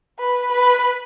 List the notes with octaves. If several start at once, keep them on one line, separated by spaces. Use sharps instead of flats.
B4
B4